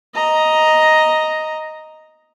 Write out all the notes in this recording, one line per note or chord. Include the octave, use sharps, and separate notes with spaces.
D#5 A#5